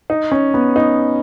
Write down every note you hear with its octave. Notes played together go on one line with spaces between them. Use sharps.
D#4
C#4
B3
D#4